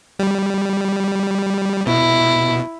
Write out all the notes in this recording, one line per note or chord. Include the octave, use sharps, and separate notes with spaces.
G3
B2 E4